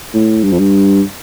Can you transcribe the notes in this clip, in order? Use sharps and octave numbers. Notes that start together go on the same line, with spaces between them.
A2
G2
F2
G2